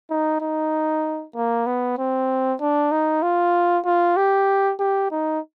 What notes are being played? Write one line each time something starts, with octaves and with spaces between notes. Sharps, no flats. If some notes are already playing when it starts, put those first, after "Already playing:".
D#4
D#4
A#3
B3
C4
D4
D#4
F4
F4
G4
G4
D#4